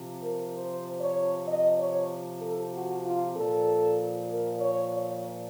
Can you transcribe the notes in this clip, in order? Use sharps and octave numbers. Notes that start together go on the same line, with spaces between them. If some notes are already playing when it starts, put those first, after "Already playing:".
Already playing: C3 F3
A#4
C5
C#5
D#5
C#5
A4
F#4
F4
A#2 F3 A4
A#4
C#5
C#5